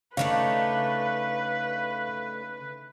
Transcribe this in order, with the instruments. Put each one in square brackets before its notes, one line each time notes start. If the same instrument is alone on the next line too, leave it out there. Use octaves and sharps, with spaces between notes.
[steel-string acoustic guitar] C#3 D#4 [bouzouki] A3 D4 C#5 [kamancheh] B4 [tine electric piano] F5